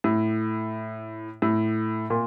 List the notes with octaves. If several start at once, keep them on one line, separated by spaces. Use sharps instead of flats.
A2
A2
A#2